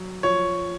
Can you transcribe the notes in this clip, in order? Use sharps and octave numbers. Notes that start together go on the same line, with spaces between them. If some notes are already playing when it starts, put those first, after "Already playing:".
Already playing: F#3
F3 C#5